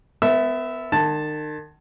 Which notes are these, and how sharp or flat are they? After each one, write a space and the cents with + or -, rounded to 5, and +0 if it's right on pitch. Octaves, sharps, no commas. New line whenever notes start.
B3 +30 A#4 -5 E5 -5
D#3 -40 A5 +0